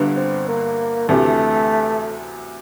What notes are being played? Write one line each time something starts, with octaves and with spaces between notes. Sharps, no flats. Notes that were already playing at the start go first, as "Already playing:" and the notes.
Already playing: G1 G2 D3
C4
A#3
D2 C3 E3 A3